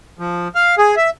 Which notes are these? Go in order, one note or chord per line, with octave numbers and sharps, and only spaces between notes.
F3
F5
G#4
E5